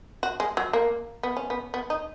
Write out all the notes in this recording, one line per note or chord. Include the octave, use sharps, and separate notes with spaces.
F#4
G#3
F#3
A#3
B3
C#4
B3
B3
D#4